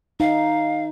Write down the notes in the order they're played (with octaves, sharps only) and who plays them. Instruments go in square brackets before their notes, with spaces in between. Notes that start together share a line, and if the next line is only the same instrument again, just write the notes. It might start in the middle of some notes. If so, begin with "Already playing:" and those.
[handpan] D#4 [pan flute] F5